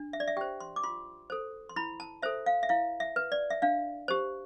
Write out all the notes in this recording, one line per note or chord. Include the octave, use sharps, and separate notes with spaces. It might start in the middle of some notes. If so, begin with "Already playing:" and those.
Already playing: D4
E5
D5
E5
G4 C5 G5
C6
D6
F4 C6
A4 C5
C6
E4 B5
A5
A4 C5 E5
F5
E5
E4 F5
E5
B4
D5
E5
D4 F5
G4 C5